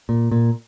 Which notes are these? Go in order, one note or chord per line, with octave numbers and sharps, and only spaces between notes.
A#2
A#2